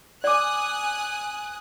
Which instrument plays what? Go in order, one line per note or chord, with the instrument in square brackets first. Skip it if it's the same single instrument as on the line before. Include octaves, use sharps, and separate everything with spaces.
[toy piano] D5 D6 [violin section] G#5 D#6 F#6